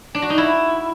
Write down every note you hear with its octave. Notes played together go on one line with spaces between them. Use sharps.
D4
F#4
D#4
E4